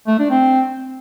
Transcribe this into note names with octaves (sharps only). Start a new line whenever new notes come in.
A3
D4
C4